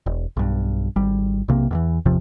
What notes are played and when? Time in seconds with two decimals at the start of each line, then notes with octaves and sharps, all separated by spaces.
0.06 E1
0.37 B1 G2
0.96 G#1 G3
1.48 B1 C3 A#3
1.71 E2 D#3 E3
2.05 G#1 E2 C3 F3